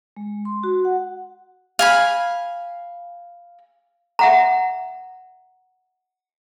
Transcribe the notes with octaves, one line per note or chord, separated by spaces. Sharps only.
G#3
C6
F#4
F#5
F5 G#5 B5
E5 F#5 A#5